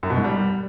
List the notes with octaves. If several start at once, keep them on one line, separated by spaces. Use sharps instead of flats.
F#2
B2
G#2
G3